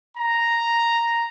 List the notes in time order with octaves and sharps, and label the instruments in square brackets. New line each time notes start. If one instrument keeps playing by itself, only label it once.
[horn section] A#5